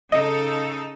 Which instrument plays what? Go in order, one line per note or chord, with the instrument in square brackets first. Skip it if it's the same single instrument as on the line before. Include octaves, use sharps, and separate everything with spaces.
[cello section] C#3 D#4 A4 [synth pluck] D#5